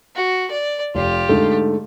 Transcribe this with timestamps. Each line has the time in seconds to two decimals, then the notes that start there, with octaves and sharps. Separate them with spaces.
0.15 F#4
0.51 D5
0.95 F1 F4 G4
1.29 G#2 D3 A3